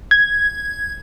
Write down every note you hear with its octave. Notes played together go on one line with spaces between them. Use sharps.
G#6